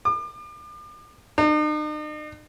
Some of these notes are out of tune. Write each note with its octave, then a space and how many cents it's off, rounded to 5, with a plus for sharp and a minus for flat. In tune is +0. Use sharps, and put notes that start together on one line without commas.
D6 +40
D#4 -45